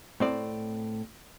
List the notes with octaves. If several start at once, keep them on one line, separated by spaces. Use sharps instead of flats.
A2 C4 D5